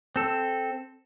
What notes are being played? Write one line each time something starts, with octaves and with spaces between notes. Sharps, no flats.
C4 A4